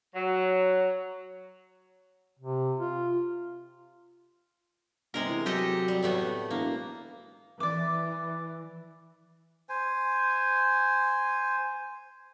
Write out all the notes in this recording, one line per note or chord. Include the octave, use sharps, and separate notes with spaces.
F#3
C3
F4
G1 C3 G#3 A#4
E3
F#3 G4 A4 D#5
G3
A2 A3 B3
E1 A#3
E3 D5 D6
C5 G#5